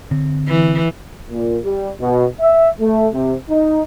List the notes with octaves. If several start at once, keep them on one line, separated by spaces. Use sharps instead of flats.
D3 C4
E3
A#2
G3
B2
E5
A3
C3
D#4